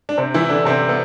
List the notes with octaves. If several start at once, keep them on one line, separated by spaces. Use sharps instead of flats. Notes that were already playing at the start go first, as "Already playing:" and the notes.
D4
C3 C4
E3 E4
D3 D4
C3 C4
B3